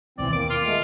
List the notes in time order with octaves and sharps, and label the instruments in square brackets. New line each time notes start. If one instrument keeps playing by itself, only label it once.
[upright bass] D#2 B2 [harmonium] E3 C4 [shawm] D5
[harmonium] A#3 [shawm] D6
[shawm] F4
[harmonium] G#3 A3